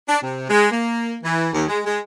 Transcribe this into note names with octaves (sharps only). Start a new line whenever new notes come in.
D4
C3
G#3
A#3
E3
D#2
G#3
G#3